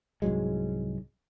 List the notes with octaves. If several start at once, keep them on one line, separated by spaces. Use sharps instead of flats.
C2 G#2 F#3 G#3